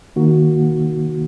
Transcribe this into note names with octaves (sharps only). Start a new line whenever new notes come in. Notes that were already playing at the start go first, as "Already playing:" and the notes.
D#3 A#3 D#4 F#4